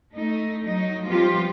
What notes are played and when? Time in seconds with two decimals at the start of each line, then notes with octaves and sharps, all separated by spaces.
0.15 A3 D#4
0.64 F#3 D#4
1.04 F3 G3 B3 C4 F4 G4